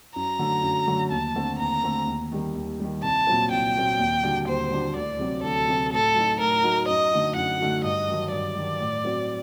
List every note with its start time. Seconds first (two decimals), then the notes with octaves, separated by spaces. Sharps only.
0.15 F#2 A#5
0.39 D3 F#3 A3
0.63 F#2
0.88 D3 F#3 A3
1.11 D#2 A5
1.36 D3 A3 C4
1.59 D#2 A#5
1.84 D3 A3 C4
2.07 D#2
2.32 D#3 G3
2.55 D#2
2.80 D#3 G3
3.03 C2 A5
3.27 A#2 F#3 C4
3.51 C2 G5
3.76 A#2 F#3 C4
3.99 D#2
4.23 D3 G3 D4 F#4
4.48 D#2 C5
4.71 D3 G3 D4 F#4
4.96 D2 D5
5.19 C3 F#3 C4
5.43 D2 A4
5.68 C3 F#3 C4
5.92 A2 A4
6.15 F#3 A3 D#4 F#4
6.40 A2 A#4
6.63 F#3 A3 D#4 F#4
6.88 F#2 D#5
7.12 D3 A3 D#4 F#4
7.36 F#2 F#5
7.60 D3 A3 D#4 F#4
7.84 G2 D#5
8.08 D#3 F#3
8.32 G2 D5
8.55 D#3 F#3
8.79 A2
9.04 F#3 C4 F#4